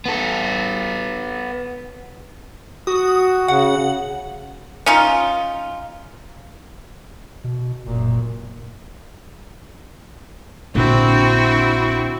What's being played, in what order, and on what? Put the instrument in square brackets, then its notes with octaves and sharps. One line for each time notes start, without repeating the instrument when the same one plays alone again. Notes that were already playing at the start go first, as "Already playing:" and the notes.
[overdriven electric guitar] B3 A4
[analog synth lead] F#4 [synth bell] D#6
[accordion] C#3 [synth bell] F#5
[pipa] C#4 D#4 F4
[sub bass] B2
[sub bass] F1 [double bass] F#2 A#2
[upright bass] A#1 D3 [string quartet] C4 E4 F#4